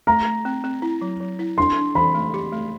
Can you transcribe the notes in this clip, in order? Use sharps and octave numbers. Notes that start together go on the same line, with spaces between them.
A3 A#5
A3
C4
C4
E4
F#3
F#3
E4
D4 C6
D4
E3 B5
A3
G4
A3